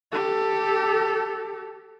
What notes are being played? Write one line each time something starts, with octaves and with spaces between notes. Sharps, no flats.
G4 A4